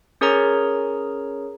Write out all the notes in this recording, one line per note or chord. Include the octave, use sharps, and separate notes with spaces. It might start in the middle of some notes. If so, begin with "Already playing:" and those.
C#4 G#4 A#4 C#5 A#5